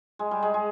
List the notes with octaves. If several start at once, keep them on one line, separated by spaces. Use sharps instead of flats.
G#3
G3
G#3
G#3